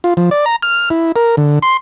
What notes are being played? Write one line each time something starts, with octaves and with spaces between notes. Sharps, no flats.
F4
F3
D5
A#5
F6
E4
A#4
D3
C6